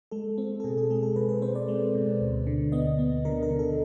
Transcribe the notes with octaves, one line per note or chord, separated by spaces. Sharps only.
G#3 A4
C4
A4
B2 G#4
G#4
G#3 G#4
A4
B2 B4
B4
C4 C5
D5
G#3
B2
D2
D3
B3 D#5
B3
D3 A#4
A#4
D3
A4